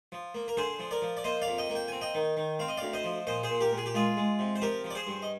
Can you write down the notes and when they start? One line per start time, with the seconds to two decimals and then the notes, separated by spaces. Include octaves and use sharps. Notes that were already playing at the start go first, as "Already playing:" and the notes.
0.12 F3
0.35 A#3
0.48 A#4
0.57 D3 G#4 C5
0.79 F3
0.91 A#4 D5
1.02 F3
1.17 D5
1.24 A#3 C5 D#5
1.42 D5 F5
1.47 F2
1.58 D#5 G5
1.70 A#3
1.75 G5
1.88 C4 G#5
2.01 D#5 G5
2.15 D#3
2.37 D#3
2.59 C4 F5
2.68 D#5
2.77 D2 D5 F5
2.93 C5 D#5
3.04 F3
3.27 A#2 C5 D#5
3.43 G#4 C5
3.50 A#2
3.60 G4 A#4
3.72 A#2
3.78 G#4
3.86 G4
3.94 G#3 F4 G#4
4.17 G#3
4.39 C3
4.56 C5
4.62 F3 G4 A#4
4.84 F3
4.90 D5
4.95 G#4 C5
5.07 G2
5.22 D#5